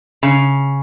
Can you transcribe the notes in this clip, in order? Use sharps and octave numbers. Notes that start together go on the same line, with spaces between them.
C#3